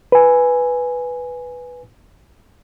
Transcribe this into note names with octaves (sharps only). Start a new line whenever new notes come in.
B4 G#5